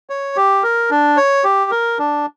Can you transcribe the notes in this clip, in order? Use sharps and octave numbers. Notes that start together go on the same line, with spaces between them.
C#5
G4
A#4
D4
C#5
G4
A#4
D4